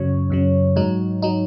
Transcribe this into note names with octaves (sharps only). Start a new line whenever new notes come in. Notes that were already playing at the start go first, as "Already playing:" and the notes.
Already playing: F#2 C#3 F#3 C#5
F#2 C#3 F#3
G#2 F#3 D#4
F#3 D#4